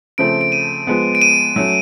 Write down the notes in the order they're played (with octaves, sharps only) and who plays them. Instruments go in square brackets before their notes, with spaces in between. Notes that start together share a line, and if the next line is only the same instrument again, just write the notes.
[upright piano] C#3 F3 A3 C4 [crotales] D7
[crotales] D7
D#7
[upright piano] F3 G#3 B3
[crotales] D7
D#7
[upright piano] F#3 A3 C#4